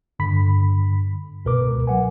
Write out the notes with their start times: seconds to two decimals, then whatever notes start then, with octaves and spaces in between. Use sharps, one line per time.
0.19 G2 D3 B5 B6
1.45 C#2 B2 A#4 B4 D6
1.87 F#3 F#5 G#5